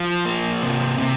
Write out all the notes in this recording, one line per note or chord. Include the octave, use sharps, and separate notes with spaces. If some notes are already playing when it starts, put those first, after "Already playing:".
Already playing: F3
A#3
C3
C3